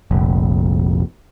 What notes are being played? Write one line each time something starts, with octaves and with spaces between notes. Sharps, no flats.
F1 A#1